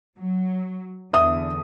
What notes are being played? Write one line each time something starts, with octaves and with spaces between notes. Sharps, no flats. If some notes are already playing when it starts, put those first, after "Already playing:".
F#3
E2 D3 E5 D#6